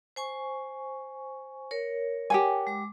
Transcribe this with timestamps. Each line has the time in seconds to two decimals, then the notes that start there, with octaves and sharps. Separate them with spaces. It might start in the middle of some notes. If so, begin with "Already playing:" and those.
0.16 C5 G#5 C#6
1.71 A#4 C#5
2.30 G4 F#5 G#5
2.67 G#3 D6